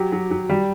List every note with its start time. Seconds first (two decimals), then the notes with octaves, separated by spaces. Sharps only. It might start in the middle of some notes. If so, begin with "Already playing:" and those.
Already playing: F#3 G4
0.12 F#3
0.31 F#3
0.49 G3